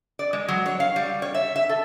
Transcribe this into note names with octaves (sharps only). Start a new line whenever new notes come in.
D5
G#3
F#3
C#5
F5
G3
C#5
E5
E5
A4